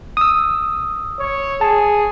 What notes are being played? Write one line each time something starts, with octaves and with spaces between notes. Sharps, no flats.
D#6 E6
C#5
G#4 A5